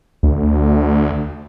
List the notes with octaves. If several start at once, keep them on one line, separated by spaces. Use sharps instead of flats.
D2